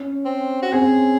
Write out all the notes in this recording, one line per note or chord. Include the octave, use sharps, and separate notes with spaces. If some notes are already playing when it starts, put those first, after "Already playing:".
Already playing: C#4
C4
F#4
C4 G#4